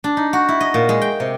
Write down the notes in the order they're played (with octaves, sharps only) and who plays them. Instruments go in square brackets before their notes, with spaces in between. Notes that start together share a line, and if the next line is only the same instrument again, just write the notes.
[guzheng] D4
D#4
F#4
E4
D#5
A#2
G#3
G5
C3